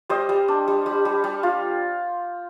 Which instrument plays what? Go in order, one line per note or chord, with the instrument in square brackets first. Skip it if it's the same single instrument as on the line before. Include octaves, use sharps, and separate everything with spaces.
[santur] G3 C5 D#5
G3
D4
G3
G3
G3
G3
F4